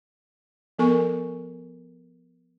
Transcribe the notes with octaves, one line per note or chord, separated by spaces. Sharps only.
F3 B3 A4 A#4 G#5 C#6